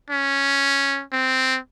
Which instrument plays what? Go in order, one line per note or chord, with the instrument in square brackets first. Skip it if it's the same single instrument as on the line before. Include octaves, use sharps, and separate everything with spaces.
[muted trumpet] C#4
C4